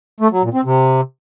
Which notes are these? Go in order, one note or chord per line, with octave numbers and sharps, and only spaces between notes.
A3
F#3
A#2
C4
C3